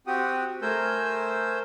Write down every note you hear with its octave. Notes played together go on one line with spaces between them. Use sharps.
C4 F#4 G4 F#5 G5 D#6
A3 A#4 C5 G#5 E6 G6